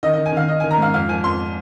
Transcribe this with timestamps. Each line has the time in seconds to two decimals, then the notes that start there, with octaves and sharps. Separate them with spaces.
0.03 D#3 D#5
0.14 D#5
0.18 D#3
0.26 G#5
0.32 D#3 F5
0.48 D#3 D#5
0.60 G#5
0.64 D#3
0.71 A#5
0.78 G#2 F5
0.94 F2 F5
1.09 F3 G#5
1.24 F2 C6